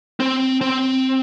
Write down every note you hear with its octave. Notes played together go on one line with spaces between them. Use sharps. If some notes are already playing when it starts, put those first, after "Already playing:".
C4
C4